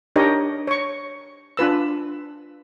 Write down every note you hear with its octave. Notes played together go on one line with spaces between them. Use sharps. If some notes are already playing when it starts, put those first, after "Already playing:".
D4 D#4 G4 A#4 C#5 D#5
C#5 C#6
D4 F4 B4 E6